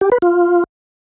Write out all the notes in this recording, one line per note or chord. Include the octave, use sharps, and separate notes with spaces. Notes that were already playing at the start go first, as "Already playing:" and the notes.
G4
B4
F4